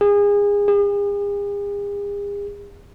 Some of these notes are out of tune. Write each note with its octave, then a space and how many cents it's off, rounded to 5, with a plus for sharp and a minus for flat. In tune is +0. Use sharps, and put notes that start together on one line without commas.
G#4 -30
G#4 -45